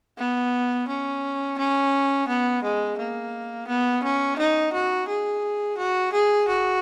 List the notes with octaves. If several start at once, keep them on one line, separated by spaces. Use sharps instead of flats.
B3
C#4
C#4
B3
G#3
A#3
B3
C#4
D#4
F#4
G#4
F#4
G#4
F#4